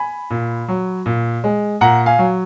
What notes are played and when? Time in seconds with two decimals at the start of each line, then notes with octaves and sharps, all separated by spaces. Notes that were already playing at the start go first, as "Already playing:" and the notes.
Already playing: G#5 B5
0.30 A#2
0.68 F#3
1.06 A#2
1.44 G#3
1.81 A#2 F#5 A#5
2.06 F5 G#5
2.19 F#3